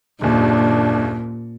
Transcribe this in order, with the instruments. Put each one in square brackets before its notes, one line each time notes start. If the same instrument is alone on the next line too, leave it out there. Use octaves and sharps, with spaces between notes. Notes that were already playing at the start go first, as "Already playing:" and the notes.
[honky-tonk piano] F#1 D#2 [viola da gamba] A#2 [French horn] D4